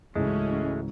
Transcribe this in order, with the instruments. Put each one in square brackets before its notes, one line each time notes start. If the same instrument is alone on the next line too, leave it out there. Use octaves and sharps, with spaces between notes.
[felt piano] C#2 G#2 E3 [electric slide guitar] G#3 A3 [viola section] C#4 E4 F#4